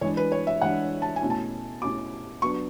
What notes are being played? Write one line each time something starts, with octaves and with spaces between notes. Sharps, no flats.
E3 G#3 D4 C#5
B4
C#5
E5
E3 G#3 D4 F#5
A5
G#5
B2 A3 C#4 E4
A5
B2 A3 C#4 E4 D6
F#3 B3 D4 C#6